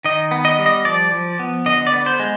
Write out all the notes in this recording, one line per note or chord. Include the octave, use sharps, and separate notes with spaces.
D#3 D#5
B3
D#5
G3
D#5
F3 D5
F3
B3
D3 D#5
D5
B3
C5
G#3